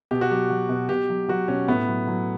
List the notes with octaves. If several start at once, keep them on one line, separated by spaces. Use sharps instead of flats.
B2 G4
F#4
F#3 G4
F#3
B2
B2 G4
F#3
F#3 F#4
B2 C#4
A2 B3
F#3
F#3